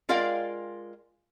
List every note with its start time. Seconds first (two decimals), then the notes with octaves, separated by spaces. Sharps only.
0.09 G#3 F4 A#4 D5 F5 G5